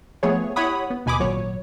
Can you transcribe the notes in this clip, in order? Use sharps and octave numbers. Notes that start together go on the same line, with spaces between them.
F3 A3 B3 G#4 C#5
E4 G4 C#5 F#5 B5 D#6
B3
D#2 B2 G#5 B5 D6 D#6
G#1 A#2 F#3 C#5